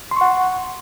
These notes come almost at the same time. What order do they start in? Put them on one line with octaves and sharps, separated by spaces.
C6 C#6 F#5